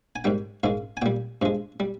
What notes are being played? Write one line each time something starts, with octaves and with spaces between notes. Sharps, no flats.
G#5
G#2 D#3 G3 G5
G#2 D#3 G#3 F5
G#5
A#2 G3 G5
G2 F3 G#3
G3